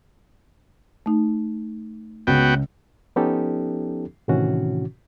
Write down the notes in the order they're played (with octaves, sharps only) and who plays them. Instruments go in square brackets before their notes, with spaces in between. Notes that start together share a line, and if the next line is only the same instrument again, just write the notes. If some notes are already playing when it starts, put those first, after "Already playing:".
[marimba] A3 D#4
[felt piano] C#2 C#3 [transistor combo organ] B3 F#4 G5
[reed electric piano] F3 B3 C#4 D#4 G4 A4
A2 C3 D#3 E3 C#4 F#4